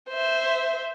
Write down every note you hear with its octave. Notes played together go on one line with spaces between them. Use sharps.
C5 E5